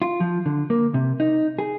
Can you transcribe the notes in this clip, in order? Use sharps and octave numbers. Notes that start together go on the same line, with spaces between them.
F4
F3
D3
A#3
C3
D#4
G#4